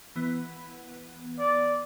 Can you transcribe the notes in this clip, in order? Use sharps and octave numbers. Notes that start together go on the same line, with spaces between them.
E3 B3
D5